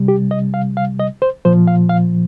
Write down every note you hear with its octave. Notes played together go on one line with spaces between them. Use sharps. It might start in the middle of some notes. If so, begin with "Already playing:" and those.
Already playing: C3 G3
G4
D#5
F5
F5
D#5
C5
A#2 F3 C5
F5
F5